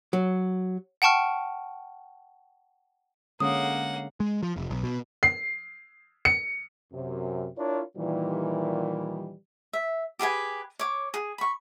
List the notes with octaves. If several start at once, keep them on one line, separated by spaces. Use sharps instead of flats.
F#3
F#5 G5 A5 C#6 F6
D3 G#3 A#3 C#4 F#5 D#6
G#3
F3
F1
B1
B2
C7
C#7
F#2 C3
D4 E4 F4 A#4 C#5
A#2 D#3 E3 G3
E5
G4 G#4 B4 G#5
C#5 D6
G#4
B5 C#6